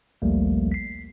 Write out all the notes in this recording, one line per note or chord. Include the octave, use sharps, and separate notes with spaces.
A#1 D#2 F3 G3 A3 A#3
B6 C7